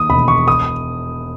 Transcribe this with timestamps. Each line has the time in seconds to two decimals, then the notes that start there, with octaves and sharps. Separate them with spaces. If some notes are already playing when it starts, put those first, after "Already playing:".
Already playing: D#2 D#6
0.10 E1 B5
0.28 C#6
0.48 D#6